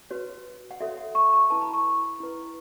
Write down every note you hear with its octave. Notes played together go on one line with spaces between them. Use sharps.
F#4 B4 C#5
F#5
F#4 A4 C#5 E5
F#5
C#6
C#6
E4 B4 A5
B5
C#6
E4 B4